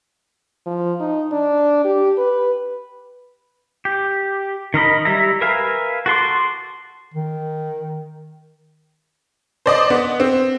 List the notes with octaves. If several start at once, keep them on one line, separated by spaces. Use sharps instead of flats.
F3
D#4
D4
G4
B4
G4
D#3 A#4 D#5 B5
G3 E4 E5 A#5
A#4 B4 E5 F5 G#5
F#4 A4 C6 D6
D#3
C5 D5 D#5
B3
C4